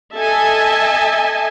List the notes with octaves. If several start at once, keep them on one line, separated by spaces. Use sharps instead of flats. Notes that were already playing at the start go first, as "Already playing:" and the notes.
A4 D#5 E5 G#5 A5